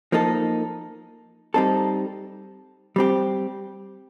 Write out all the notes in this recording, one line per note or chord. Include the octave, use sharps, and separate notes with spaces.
F3 A#3 D#4 A4
G3 C4 D#4 A4
G3 C4 G4